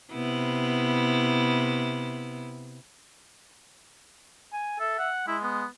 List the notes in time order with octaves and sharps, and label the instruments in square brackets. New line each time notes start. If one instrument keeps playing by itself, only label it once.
[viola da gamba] C3 B3 E4
[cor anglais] G#5
[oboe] A4 [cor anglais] E5
[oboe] F#5
[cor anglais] G#3 [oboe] E4
[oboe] B3